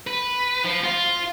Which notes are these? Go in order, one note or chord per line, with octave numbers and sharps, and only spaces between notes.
B4
F3
F4